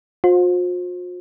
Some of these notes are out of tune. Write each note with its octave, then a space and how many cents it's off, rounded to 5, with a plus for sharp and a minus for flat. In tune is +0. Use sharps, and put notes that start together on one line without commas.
F4 +45 C5 +15